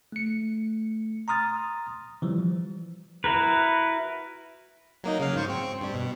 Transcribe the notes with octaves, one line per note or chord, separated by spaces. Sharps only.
A3 C#7
A#5 C6 D#6 F6 A6
E3 F3 G3
E4 F#4 A#4 B4
F#3 A#3 D#4
C#3 F#3 F5
G#2 C5 C#6
C4 C#6
G2 G3
B2